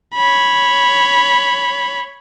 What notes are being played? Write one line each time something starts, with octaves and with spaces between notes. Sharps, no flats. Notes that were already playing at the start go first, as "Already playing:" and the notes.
C#5 B5